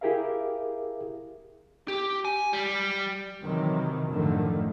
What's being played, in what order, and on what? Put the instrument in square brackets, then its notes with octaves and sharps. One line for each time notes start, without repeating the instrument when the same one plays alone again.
[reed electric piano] E4 G4 G#4 A#4 E5 F5
[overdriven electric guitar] G4
G#5
G3
[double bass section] C3 D#3 E3 F#3
F#2 A2 D3 D#3 F3 A3